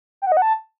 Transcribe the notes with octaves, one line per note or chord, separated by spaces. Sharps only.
G5
F#5
D#5
F#5
A5